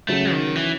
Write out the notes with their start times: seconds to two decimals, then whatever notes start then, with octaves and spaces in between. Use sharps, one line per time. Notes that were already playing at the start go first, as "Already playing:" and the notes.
0.09 C#3 F#3 A3 C#4
0.32 D#3
0.55 E3